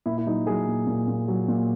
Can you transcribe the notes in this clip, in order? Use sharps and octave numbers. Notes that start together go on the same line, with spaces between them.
A#2 E4
E4
F#3 D#4
F#3 G#4
A#2
A#2
A#2
F#3
A#2